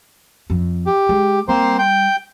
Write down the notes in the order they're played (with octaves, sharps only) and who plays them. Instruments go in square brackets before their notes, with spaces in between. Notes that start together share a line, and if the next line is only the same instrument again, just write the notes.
[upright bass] F2
[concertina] G4
[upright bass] G#3
[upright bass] G3 [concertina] A#3 C4 C5
[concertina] G5